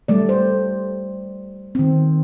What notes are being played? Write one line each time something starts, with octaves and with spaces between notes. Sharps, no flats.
G3 A3 D5
C5
D#3 C4